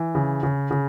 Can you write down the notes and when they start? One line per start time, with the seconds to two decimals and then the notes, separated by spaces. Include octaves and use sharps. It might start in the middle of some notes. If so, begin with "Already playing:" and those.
Already playing: E3
0.15 C#3
0.43 C#3
0.71 C#3